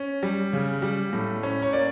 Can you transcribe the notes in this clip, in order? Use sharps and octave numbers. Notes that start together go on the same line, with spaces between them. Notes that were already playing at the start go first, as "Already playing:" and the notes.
Already playing: C#4
G3
C#3
G3
A2
C#4
C#5
A#3 D5